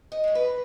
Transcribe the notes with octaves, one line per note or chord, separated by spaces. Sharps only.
D#5
G#3 C#4
B4